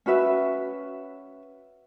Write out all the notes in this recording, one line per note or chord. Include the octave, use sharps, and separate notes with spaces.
C#4 F#4 B4 E5